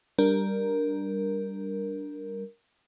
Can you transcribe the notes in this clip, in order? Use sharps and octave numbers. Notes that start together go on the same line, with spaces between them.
G3 D4 A#4